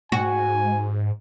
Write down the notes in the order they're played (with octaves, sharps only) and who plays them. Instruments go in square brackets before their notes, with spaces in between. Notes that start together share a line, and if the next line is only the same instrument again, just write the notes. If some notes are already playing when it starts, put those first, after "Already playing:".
[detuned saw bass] G#2 [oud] F#4 [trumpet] G#5